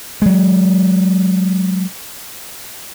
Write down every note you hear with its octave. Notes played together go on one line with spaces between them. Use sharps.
F#3 G#3